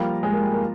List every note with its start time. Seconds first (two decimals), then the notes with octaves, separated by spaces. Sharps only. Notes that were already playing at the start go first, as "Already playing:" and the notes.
Already playing: F3 G3 A#3 F4 A#4
0.23 G#3
0.32 A#3
0.42 G3
0.51 A#3